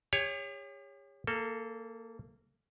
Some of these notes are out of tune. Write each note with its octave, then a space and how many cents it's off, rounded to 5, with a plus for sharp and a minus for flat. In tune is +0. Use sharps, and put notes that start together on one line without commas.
G4 +45 C#5 +0
A#3 -20 A4 +0